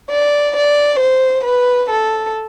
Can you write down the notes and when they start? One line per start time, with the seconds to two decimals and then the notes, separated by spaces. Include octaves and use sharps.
0.11 D5
0.55 D5
0.99 C5
1.44 B4
1.90 A4